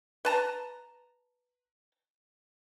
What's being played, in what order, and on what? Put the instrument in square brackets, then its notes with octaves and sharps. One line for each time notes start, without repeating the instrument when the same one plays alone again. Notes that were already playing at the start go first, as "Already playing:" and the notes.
[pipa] B4 A5 A#5